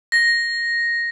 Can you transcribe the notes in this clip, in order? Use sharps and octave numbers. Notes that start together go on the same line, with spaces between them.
A#6